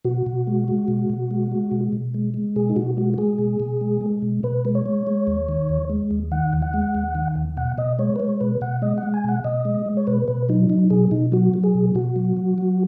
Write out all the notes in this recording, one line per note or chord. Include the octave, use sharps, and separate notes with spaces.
B2 F#4
B2
G#3
G#3
B2
B2
G#3
G#3
B2
B2
G#3
G#3
B2 G#4
D#4
B2 F#4
G#3 F#4
F#4
G#3 G#4
B2
B2
G#3
G#3
B2
B2 B4
G#3
C#5
G#3
G#3
D#2
D#3
D#2
G#3
D#2
D#3 F#5
D#2
F#5
G#3
D#2
D#3
D#2
B2 F#5
B2 D#5
G#3 C#5
B4
G#3 C#5
B2 B4
B2 F#5
G#3 D#5
F#5
G#3
G#5
B2 F#5
B2 D#5
G#3
G#3
C#5
B2 B4
B2 B4
F#3 D#4
F#3 D#4
B2 G#4
B2 D#4
F#3 F#4
F#3
G#4
B2
B2 F#4
F#3
F#3
F#3